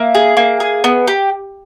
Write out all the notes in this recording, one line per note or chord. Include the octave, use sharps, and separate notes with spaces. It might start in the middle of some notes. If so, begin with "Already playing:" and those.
Already playing: A#3 E5
G#4
A#3
G#4
B3
G4